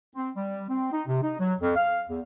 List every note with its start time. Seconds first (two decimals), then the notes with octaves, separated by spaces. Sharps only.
0.15 C4
0.36 G3
0.69 C4
0.92 D#4
1.07 C3
1.22 D#4
1.39 F#3
1.60 F2
1.75 F5
2.09 E2